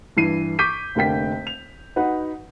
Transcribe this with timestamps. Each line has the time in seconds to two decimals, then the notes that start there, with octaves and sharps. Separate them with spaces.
0.17 G2 E3 C7 D#7
0.59 C#6 D6 G6 B6 D#7
0.95 F1 D3 A#3 G5 B6
1.47 F7
1.96 D#4 F#4 B4 F#5